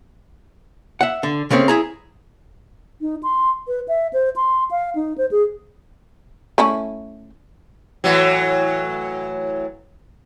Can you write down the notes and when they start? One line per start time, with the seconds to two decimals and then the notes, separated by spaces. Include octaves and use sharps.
1.01 E5 F#5
1.23 D3
1.50 C#3 A3 A#3 C4 C#4
1.68 E4 G#4 A#5
3.01 D#4
3.23 C6
3.68 B4
3.88 E5
4.13 C5
4.36 C6
4.71 F5
4.95 D#4
5.18 C5
5.31 G#4
6.58 A3 C#4 E4
8.04 A2 E3 F#3